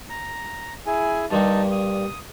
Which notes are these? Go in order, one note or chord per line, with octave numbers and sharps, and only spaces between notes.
A#5
E4 G#4 G#5
G2 A#2 G3 D#4 A5
D#6